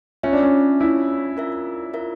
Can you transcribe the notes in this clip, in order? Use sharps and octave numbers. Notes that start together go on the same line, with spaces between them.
C#4 F4 C#5 E5
D4
C#4
E4 F4 C#5 E5
F4 A#4 E5
F4 A#4 E5